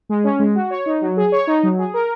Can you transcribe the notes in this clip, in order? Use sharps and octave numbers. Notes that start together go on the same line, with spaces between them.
G#3
C#4
G#3
F#4
C#5
D#4
F#3
G#4
C#5
D#4
F#3
G#4
A#4